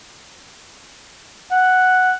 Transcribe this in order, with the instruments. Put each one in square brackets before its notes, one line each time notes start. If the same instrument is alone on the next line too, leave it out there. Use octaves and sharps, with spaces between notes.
[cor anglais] F#5